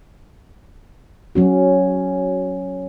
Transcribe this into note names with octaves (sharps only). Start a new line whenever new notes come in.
F#3 C#4 F#4